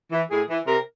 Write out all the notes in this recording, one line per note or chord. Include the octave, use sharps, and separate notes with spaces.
E3
A2 G#4
E3
C3 A#4